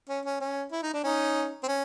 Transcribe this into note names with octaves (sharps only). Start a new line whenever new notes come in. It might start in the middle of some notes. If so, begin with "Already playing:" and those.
C#4
C#4
C#4
E4
D#4
D4
C#4 D#4
C4
C#4